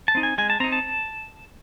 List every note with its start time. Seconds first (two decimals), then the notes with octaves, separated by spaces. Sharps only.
0.08 A5
0.15 C4 D#4
0.23 G#5
0.38 G#3 G#5
0.50 A5
0.60 C4 A#5
0.64 D#4
0.72 A5